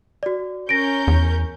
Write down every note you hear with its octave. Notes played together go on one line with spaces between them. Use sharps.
F#4 D5
C#4 A#4 G6 A#6 D7
E2